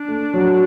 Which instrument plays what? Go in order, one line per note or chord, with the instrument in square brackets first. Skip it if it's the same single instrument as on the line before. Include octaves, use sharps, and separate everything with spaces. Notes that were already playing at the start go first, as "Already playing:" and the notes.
Already playing: [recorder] D4
[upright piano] A3
F#3